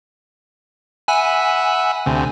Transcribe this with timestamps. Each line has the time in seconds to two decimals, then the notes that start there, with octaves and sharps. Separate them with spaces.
1.08 E5 F#5 G#5 B5
2.06 D2 C3